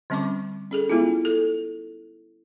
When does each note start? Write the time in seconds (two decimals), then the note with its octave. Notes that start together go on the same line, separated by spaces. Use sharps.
0.10 D3 G3 C4 C#4 C#6 D6
0.71 C#4 G#4 A4
0.90 G#3 B3 C#4 E4 F4
1.25 A4